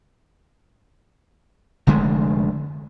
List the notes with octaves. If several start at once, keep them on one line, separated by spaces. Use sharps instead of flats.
F1 D3 G#3 A3